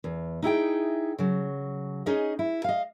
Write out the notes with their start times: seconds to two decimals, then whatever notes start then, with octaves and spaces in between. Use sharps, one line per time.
0.04 E2
0.43 D#4 E4 G#4 G5
1.18 C#3 F#3
2.06 C#4 D#4 G#4 D#5
2.39 E4
2.64 D#5 F5